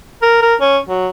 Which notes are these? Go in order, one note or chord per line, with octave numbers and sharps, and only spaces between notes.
A#4
A#4
C#4
F#3